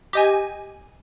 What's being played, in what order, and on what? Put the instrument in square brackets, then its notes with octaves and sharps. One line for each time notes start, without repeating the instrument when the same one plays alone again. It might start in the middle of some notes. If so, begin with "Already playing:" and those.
[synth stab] G4 D#5 G#5